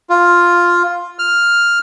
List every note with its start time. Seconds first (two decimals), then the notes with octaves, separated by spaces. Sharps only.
0.10 F4
1.19 F6